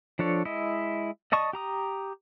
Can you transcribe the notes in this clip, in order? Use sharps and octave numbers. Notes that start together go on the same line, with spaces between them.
F3 D4 A4 C#5
G#3 E4 D#5
D5 D#5 A5 C#6 D#6
G4 A#5 D#6